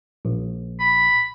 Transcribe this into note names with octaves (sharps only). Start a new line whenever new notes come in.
A#1
B5